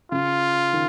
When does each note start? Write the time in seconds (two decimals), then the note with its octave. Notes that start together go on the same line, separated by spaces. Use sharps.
0.11 C#3 F4
0.73 D#3